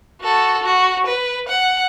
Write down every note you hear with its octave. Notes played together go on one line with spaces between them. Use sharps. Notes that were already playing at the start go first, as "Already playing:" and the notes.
F#4 A4
F#4
B4
F#5